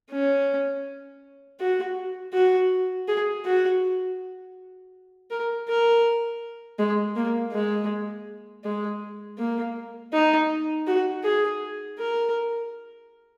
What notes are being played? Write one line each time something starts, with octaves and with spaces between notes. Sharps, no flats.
C#4
F#4
F#4
G#4
F#4
A#4
A#4
G#3
A#3
G#3
G#3
A#3
D#4
F#4
G#4
A#4